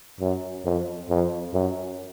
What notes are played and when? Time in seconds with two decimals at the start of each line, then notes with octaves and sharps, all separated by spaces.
0.20 F#2
0.64 F2
1.09 F2
1.53 F#2